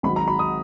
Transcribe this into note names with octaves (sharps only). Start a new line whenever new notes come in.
G#1 G#2 F#3 B5
A#5
B5
D#6